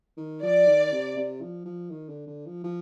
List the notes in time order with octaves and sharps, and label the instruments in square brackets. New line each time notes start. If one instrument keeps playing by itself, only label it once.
[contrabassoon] D#3
[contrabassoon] F3 [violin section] D5
[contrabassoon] D#3
C3
C3
F3
F3
D#3
D3
D3
F3
F3